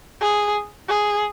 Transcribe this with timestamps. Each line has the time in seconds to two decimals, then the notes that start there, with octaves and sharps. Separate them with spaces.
0.21 G#4
0.88 G#4